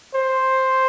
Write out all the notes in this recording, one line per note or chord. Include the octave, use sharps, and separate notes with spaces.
C5